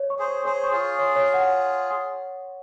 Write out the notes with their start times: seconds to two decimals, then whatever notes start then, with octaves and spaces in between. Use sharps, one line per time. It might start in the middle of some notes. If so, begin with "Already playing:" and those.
Already playing: C#5
0.10 C#6
0.19 G#4 C5
0.28 C#5
0.45 G#4 C5 C#5
0.64 C#6
0.72 F4 G#4
0.80 C#6
0.99 C#5
1.16 C#5
1.34 F#5